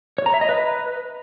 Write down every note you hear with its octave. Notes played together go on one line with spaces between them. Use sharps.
C#5
A#5
E5
D#5
B4